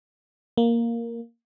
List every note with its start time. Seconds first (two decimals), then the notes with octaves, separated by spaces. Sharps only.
0.57 A#3